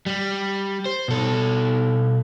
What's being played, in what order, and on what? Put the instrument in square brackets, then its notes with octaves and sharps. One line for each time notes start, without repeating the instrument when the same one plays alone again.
[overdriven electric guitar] G3
C5
B2 A4